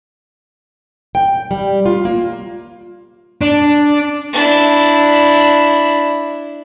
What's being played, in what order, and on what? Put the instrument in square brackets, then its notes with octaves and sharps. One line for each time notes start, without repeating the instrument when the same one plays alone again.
[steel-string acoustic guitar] G5
G3
F4
A#3
[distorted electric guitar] D4
[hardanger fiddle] D4 E4